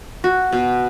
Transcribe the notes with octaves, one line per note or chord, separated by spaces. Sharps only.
F#4
B2